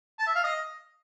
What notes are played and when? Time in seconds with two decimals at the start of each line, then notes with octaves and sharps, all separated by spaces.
0.19 A5
0.27 E5
0.35 F5
0.44 D#5